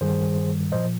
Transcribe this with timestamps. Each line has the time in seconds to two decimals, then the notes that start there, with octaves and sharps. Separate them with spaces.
0.01 G2 D#3 G3 G#4 C5
0.72 A#2 F3 C5 D#5